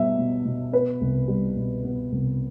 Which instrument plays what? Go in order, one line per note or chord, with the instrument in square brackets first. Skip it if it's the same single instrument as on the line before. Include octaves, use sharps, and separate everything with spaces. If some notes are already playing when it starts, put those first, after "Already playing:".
Already playing: [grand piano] B2 G3 B3 E5
B2
B2
B3 B4
C2
G3
B2
B3
C2